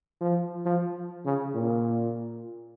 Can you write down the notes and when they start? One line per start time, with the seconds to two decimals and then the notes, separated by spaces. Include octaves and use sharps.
0.21 F3
0.66 F3
1.26 C#3
1.55 A#2